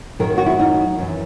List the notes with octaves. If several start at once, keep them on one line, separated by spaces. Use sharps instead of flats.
F#2 D#3 F#3 A#4
F#4
E4
D#4
F#2 E3